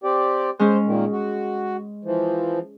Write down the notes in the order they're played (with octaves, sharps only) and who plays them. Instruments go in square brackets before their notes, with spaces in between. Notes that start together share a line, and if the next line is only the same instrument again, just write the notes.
[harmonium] C4 G4 D5
[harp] G#3 C#4 [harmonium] C5
[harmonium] A#2 D#3
F#4
E3 F3